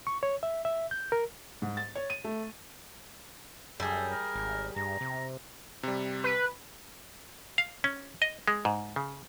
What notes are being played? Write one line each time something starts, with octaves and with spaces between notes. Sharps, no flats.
C#6
C#5
E5
E5
G6
A#4
G#2
A6
C#5
D#7
A3
F#2 G3 G#4 A4
A#4
G#1
G2 A#5
C3
C3 G3
B4
F5
C#4
D#5
G#3
G#2
C#3